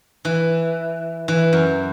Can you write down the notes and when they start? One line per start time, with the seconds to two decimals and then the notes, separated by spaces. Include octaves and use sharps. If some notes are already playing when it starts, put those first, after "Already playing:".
0.25 E3
1.28 E3
1.53 F#2